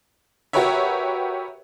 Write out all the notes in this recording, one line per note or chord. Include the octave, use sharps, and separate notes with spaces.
F#4 G4 A#4 B4 C#5 E5